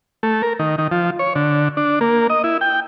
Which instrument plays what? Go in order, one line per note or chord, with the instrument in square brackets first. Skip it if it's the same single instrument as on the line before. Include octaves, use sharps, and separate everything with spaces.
[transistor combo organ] A3
A#4
D#3
D#3
F3
C#5
D3
D4
A#3
D#5
E4
G5